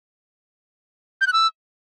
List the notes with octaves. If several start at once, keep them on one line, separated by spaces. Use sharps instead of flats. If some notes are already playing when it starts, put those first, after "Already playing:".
G6
F#6
E6